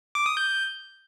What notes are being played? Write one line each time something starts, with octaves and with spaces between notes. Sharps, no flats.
D6
D#6
G6